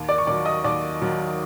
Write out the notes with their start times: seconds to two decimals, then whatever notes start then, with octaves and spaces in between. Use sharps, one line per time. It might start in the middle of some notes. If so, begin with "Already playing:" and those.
Already playing: D#2
0.08 D5 D6
0.18 C#6
0.27 D#3 F#3 D5 D6
0.45 D#5 D#6
0.64 D#2 D5 D6
1.01 D#3 F#3